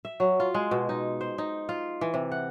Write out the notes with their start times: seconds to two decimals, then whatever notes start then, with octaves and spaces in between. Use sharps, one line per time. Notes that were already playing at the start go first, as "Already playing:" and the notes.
0.05 E5
0.20 F#3
0.40 F4
0.54 G#3
0.71 B2
0.89 D#4
1.21 C5
1.38 D#4
1.69 F4
2.01 E3
2.14 C3
2.32 F#5